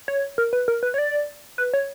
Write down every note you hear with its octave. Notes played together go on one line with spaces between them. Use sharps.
C#5
A#4
B4
A#4
B4
C#5
D5
B4
C#5